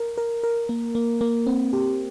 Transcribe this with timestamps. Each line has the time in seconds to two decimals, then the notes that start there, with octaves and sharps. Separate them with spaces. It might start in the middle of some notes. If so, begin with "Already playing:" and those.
Already playing: A#4
0.18 A#4
0.44 A#4
0.69 A#3
0.95 A#3
1.21 A#3
1.47 C4
1.73 G4